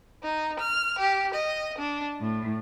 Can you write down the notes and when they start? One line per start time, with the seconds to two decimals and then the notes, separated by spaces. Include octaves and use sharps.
0.22 D#4
0.59 F6
1.00 G4
1.34 D#5
1.78 D4
2.20 A2